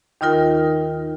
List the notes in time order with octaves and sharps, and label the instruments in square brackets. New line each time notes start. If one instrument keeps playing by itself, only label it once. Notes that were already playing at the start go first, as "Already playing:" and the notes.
[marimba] D#2 D#3 D#4 F4 A#4 G5